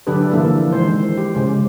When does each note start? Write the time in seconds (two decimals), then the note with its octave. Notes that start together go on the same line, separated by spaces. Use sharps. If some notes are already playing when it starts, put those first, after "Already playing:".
0.07 D3 F#3 D4 G4 A4 B4
0.31 D3 E3 F3 A#3 E4 A4
0.73 D#3 E3 G#3 C4 C5
1.18 G4
1.35 C#3 G#3 C5